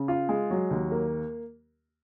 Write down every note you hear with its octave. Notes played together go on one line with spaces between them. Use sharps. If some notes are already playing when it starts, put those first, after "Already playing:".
Already playing: C#3
F4
G#3
F#3
D#2
A#3